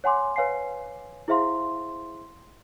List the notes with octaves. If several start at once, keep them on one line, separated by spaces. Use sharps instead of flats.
C#5 F#5 G#5 C6 D6
B4 C#5 F5 G#5 C7
E4 G#4 C5 E5 F5 C6